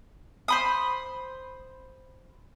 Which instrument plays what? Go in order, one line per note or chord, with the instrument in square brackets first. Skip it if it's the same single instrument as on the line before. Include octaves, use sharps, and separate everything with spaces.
[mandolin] C5 B5 D#6